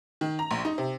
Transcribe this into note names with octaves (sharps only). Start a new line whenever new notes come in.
D#3
A#5
A#1
D#4
C3